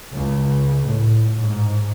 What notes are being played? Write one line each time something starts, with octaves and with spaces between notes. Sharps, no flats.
C#2
A2
G#2